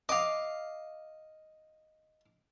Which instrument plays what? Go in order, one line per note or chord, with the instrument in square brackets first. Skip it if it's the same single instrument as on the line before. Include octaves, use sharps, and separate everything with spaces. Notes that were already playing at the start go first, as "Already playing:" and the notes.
[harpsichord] D#5 [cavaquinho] F5 D6